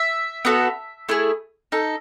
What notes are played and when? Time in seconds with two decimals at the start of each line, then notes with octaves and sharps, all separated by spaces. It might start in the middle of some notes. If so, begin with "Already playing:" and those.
Already playing: E5
0.45 B3 F#4 A4
1.09 A3 E4 G#4
1.72 D#4 A4